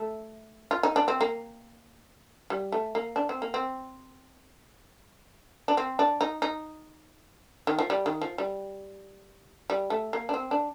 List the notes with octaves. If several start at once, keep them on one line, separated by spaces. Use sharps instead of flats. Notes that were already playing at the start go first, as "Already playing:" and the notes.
Already playing: A3
F4
D#4
D4
C4
A#3
G3
A3
A#3
D4
C4
A#3
C4
D4
C4
D4
D#4
D#4
D#3
F3
G3
D#3
F3
G3
G3
A3
A#3
D4
C4
D4